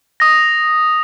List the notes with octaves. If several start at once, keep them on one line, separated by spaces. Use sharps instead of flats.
D#6 A#6